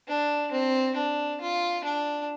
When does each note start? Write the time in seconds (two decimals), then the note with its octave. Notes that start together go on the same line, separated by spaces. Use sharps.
0.08 D4
0.52 C4
0.97 D4
1.41 F4
1.84 D4